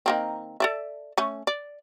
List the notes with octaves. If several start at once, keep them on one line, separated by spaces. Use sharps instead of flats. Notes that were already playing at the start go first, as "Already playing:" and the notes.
D#3 A#3 C4
A4 D5 E5
A3 C#4
D5